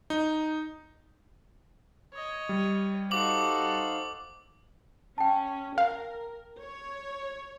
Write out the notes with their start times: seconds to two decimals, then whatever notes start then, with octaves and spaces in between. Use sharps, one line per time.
0.10 D#4
2.14 C#5 D#5
2.49 G3
3.11 D#4 F#4 A4 C5 F5 D6 F#7
5.18 C#4 G5 A5
5.78 A#4 F5
6.59 C#5